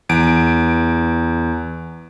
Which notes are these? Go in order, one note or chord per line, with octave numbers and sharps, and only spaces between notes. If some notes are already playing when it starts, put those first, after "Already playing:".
E2 D7